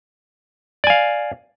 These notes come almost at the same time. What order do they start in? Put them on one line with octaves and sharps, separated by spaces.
D5 G#5 F5